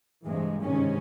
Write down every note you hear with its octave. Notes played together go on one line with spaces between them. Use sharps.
G2 C3 E3 G#3
G1 G#2 C3 D#3 G#3 C#4